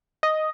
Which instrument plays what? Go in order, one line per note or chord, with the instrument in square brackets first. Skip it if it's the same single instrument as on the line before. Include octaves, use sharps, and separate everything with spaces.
[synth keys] D#5